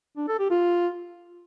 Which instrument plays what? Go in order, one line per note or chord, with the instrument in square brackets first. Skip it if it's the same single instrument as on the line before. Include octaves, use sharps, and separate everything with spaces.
[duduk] D4
A4
G4
F4